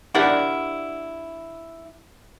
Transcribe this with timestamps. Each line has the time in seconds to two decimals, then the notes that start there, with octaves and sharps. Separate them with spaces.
0.15 D4 E4 G4 A#4 D5 F#5